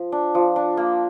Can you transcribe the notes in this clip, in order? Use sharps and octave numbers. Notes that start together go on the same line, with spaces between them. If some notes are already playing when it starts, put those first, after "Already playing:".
Already playing: F3
D4
F3
D4
A#3